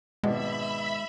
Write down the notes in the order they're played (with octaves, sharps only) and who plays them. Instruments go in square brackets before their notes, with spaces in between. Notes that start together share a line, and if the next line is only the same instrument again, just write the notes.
[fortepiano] G#1 B2 D5 [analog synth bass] G#3 [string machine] E5 B5